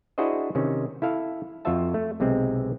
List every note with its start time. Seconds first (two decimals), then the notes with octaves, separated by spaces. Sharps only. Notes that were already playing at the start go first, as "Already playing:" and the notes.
0.18 D4 E4 F#4 G#4 C5 D#5
0.55 C3 D#3 C#4
1.02 E4 A4 F5
1.65 F2 F4 F#4 C5 E5 A5
1.94 A3
2.20 B1 C3 G#3 C4